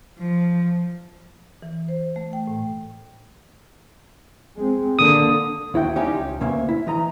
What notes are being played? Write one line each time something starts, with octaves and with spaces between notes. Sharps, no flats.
F3
E3
C5
A3
G5
A2
G#3 C4
D3 A#3 D#6
D#2 E4 F#4 G5
G3 C#4 D#4 G4
C#2
D2 B2 A#3 C#4 E5
E4
E3 D#5 A#5